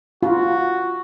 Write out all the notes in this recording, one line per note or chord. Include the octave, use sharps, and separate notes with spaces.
F4 F#4